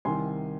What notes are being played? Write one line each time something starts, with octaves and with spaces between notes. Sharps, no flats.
C2 C3 D#3 G#5 C6